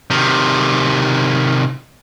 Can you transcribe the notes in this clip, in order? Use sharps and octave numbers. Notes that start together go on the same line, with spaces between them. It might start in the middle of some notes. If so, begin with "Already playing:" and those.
C3 D#3